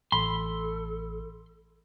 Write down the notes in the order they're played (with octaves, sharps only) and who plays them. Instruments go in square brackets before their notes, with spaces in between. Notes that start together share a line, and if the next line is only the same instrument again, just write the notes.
[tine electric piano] A1 [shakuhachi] A4 [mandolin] B5 [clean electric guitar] C6